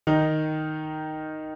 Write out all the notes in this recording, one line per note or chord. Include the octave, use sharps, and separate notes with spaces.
D#3 D#4